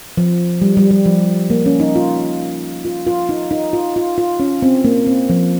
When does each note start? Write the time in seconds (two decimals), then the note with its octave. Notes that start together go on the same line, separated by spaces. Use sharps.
0.17 F3
0.62 G3
0.77 G3
0.91 G3
1.06 F3
1.50 A#3
1.66 C#4
1.80 D#4
1.96 F4
2.85 F4
3.07 F4
3.29 D#4
3.51 D#4
3.73 F4
3.96 F4
4.18 F4
4.40 C#4
4.62 C4
4.85 A#3
5.07 C4
5.30 F3